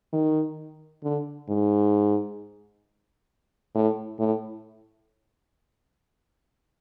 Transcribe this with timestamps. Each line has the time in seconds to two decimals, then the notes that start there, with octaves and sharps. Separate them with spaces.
0.13 D#3
1.03 D3
1.49 G#2
3.75 A2
4.19 A2